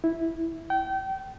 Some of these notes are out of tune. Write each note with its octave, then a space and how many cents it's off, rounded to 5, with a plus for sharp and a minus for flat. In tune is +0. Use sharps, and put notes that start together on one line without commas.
E4 -10
G5 -30